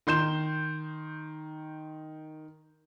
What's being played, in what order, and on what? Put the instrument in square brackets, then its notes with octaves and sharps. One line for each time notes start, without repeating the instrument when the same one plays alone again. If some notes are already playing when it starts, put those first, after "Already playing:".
[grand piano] D#3 C6 G6 E7